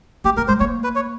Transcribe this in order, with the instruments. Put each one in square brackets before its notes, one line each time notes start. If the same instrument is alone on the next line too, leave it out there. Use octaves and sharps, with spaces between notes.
[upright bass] A#3 [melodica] G4
[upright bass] A#3 [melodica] A#4
[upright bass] G#3 [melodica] C5
[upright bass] A#3 [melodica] C#5
[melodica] B4
C#5